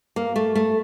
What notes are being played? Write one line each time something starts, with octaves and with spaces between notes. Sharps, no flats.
A#3
A3
A3